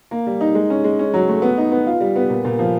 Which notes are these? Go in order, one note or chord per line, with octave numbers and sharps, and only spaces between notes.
A#3
G3
D#4
G#3
C#4
G#3
C#4
F#3
A3
B3
D#4
B3
F4
G3
B3
A#2
A#2
F3